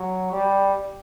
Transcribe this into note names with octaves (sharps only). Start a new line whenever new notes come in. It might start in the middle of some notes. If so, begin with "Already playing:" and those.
Already playing: F#3
G3